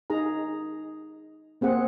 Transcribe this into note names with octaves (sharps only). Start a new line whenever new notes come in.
D#4 G#4 A#5
A#3 C4 G#4 F#5